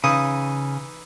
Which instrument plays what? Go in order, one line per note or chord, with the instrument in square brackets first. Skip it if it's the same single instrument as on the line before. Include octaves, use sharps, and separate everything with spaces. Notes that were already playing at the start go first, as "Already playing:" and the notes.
[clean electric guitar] C#3 [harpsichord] E3 D#4 D#6